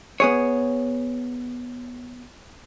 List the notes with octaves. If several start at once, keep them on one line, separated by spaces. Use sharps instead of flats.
B3 G#4 C#5